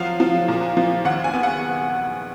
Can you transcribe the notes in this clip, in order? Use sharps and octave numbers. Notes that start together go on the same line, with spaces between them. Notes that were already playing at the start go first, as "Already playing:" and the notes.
Already playing: F3 F#3 F5
F3
A#2
F3
D#2 F#5
G#5
B3
F#5